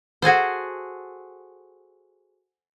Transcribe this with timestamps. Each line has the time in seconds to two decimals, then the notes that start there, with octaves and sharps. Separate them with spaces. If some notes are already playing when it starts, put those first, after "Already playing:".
0.22 F#4 G#4 A4 C5